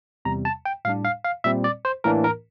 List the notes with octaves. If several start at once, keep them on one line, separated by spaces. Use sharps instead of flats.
E2 C3 G3 A#5
A5
G5
A2 G3 D4 F5
F5
F5
A#2 G3 C4 E5
D5
C5
A2 E3 A#3 D4 A#4
A#4